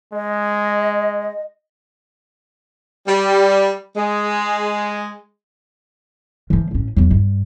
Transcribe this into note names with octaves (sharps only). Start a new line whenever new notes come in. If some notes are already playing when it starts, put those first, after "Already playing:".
G#3 D#5
G3
G#3
E3 F3
A1 C#4
E2 F#3
G2